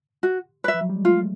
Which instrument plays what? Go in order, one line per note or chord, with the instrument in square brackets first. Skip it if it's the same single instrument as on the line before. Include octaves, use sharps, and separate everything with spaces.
[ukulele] F#4
B4 E5
[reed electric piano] F3
F#3
G3
G#3
[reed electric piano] A3 [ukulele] F4